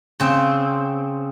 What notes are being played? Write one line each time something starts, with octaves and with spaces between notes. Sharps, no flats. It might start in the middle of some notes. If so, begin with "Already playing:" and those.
C#3 C4